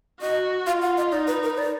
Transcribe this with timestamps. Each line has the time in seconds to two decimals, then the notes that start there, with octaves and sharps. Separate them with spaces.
0.22 F#4 D#5
0.67 F4 F5
0.82 F#5
0.97 D#5
1.12 D#4 D5
1.27 B4
1.43 A#4
1.50 B4
1.58 D5